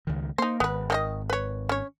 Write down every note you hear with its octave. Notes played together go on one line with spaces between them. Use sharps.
C#2 D#3
A#3 D#4 C5
G#1 B3 B4
D#3 D4 D#5
B4 C#5
C#4 C#5